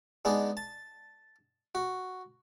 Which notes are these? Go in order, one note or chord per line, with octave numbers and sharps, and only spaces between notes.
G#3 B3 D4 D#4 G#4
A5
F#4